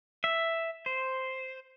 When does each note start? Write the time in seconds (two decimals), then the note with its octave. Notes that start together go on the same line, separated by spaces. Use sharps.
0.24 E5
0.86 C5